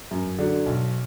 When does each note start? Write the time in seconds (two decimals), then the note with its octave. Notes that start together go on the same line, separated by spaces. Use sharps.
0.11 F#2
0.39 D3 F#3
0.66 B1